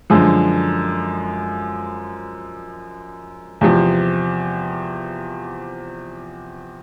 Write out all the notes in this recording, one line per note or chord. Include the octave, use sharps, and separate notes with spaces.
F#2 D3 F3 G#3
E2 C3 F3